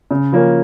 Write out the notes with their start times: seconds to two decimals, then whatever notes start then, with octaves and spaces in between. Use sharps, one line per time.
0.11 C#3
0.32 F3 A#3 C#4